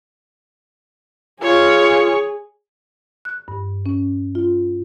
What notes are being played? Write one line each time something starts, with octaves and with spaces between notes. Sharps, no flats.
F4 G#4 C#5
F#6
G2
C#4
F4